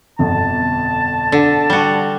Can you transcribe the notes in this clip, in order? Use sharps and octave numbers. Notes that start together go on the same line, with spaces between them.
G1 F2 B2 A5
D3
G3 F#4